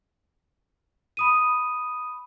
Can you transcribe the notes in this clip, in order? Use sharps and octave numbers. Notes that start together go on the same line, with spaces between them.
B5 D#6 D#7